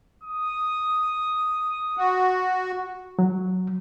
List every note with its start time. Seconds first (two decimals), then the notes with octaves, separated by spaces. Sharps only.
0.24 D#6
1.97 F#4
3.19 F#3